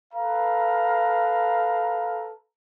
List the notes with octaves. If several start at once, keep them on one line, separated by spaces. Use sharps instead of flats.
A4 B4 F5 A#5